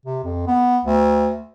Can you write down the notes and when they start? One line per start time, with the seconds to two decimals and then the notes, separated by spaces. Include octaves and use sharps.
0.06 C3
0.24 F2
0.47 B3
0.85 D2